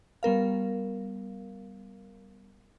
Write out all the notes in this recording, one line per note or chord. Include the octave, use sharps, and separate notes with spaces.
G3 B3 A#4 F5